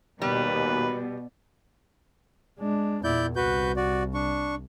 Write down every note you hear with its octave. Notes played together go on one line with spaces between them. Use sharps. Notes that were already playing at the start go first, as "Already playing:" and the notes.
D#2 B2 G3 B4
G#3 D4
E2 A#2 E4 D5 G6
C2 F#4 B4 G6
F#4 D5
D4 C#6